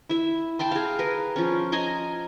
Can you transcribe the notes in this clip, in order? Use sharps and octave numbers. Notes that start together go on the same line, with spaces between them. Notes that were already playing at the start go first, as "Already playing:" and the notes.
E4 E5
G5 A5 B5 C6
G#4 F5
A#4 B4
F3 C#4
D#5 G#5 A#5 C6